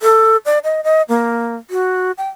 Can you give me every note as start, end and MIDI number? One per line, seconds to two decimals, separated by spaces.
0.01 0.37 69
0.46 0.59 74
0.64 0.81 75
0.84 1.02 75
1.09 1.56 58
1.70 2.12 66
2.18 2.28 79